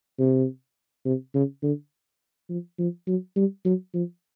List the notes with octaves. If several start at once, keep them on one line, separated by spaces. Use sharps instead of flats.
C3
C3
C#3
D3
F3
F3
F#3
G3
F#3
F3